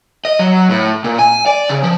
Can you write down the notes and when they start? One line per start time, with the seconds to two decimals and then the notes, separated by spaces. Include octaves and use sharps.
0.25 D#5
0.39 F#3
0.71 A2
1.04 A#2
1.19 G#5
1.46 D5
1.69 C#3
1.83 F3